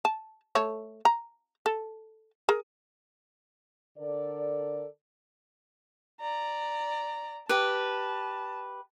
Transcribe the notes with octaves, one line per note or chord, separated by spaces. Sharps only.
A5
A3 A4 C#5
A#5
A4
G#4 A#4
D3 A4 A#4 D5
D5 A#5
G4 B4 A5